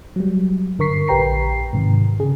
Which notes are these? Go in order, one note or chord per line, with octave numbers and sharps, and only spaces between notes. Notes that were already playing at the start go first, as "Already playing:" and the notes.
F#3 G3
G2 D3 A#4 C#6 B6 C7
A#1 G4 B4 G5 A#5 C7
G#2 C3 D#3
C#3 G#4